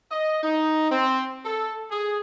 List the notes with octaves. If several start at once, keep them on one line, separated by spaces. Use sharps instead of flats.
D#5
D#4
C4
A4
G#4